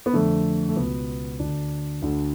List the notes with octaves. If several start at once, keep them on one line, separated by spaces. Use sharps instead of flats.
B3
F2 D3 A3
A3
C#2 B2 B3
D2 D3 D4
D2 D3